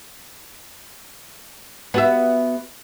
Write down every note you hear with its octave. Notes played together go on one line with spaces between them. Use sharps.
B3 F#4 E5